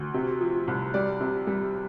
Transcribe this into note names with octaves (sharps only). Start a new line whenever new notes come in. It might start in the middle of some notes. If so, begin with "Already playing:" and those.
Already playing: D2
C3
F3
C2
G3 D5
C3
G3